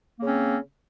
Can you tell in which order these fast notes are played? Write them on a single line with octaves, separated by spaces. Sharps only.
A#3 C#3 C#4 C4